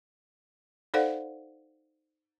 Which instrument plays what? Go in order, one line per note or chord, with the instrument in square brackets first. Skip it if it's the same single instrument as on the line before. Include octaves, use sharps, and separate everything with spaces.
[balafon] D#4 A4 C5 D5 F5 F#5